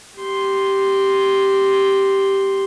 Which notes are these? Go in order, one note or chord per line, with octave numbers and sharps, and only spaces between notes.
G4 C6